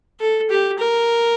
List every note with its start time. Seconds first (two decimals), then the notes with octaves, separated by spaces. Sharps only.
0.20 A4
0.50 G4
0.79 A#4